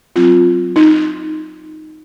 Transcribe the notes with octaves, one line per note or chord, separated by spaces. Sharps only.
F#3 C4 F4
D#4